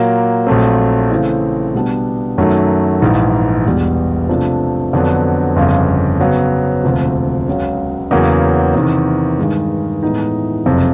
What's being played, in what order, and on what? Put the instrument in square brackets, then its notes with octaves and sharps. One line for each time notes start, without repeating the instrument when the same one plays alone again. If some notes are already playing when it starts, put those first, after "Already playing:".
Already playing: [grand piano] A#2 F#3 A#3
A#1 A#2 F#3 A3 C4
C#3 E3 A3 C4 E4
B2 G3 B3 D4
F#2 D#3 F#3 A3
A#1 G#2 E3
E1 E2 B2 G3
C3 F3 A3 D4 F4
F2 D3 F#3 B3 D4
G1 F2 C#3
C#3 F#3 B3
E1 D2 C3 F3
C#2 C#3 F#3
E2 C#3 F#3 A#3
E2 C3 D#3
G2 D#3 G#3
A2 E3 G#3 B3 D#4
F#1 F2 C3